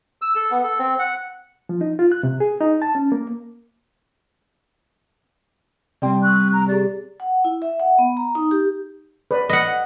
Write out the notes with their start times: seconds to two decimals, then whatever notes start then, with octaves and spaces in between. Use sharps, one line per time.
0.22 E6
0.35 A4
0.51 B3
0.64 A4
0.79 C4
0.99 F#5
1.69 F3
1.81 D#4
1.99 F4
2.12 F#6
2.23 C3
2.40 G#4
2.60 D#4
2.82 A5
2.95 C#4
3.12 A#3
6.02 C3 G3 C4 D5 G5 C6
6.23 C#6 E6 F#6
6.53 A#5
6.68 G4 G#4 D5
7.20 F#5
7.44 E4
7.62 E5
7.80 F#5
7.99 B3
8.17 A#5
8.35 D#4
8.51 G4
9.31 B4 C#5 D5
9.49 D#5 F#5 B5